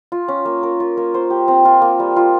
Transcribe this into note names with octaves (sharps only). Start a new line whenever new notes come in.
F4
C#4
A#3
A#4
F4
A#3
C5
G4
C4
F4
A#3
G3
F4